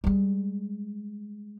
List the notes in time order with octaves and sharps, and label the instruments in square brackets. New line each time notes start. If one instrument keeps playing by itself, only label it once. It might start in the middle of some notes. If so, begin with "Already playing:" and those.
[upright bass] G3 G#3